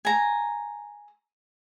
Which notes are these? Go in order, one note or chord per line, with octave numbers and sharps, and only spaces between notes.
G#5 A#5